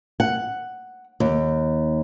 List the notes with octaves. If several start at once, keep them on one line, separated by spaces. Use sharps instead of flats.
F#5
D#2